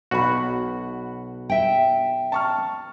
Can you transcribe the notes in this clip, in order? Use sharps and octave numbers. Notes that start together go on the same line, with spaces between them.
B1 F#4 F#5 B5
E5 G5
A5 C#6 F6